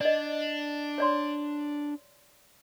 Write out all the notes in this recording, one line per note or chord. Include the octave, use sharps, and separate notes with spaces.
D4 D5 D#5
C#5 D5 C6